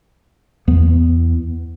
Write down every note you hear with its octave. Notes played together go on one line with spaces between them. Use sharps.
E2 B3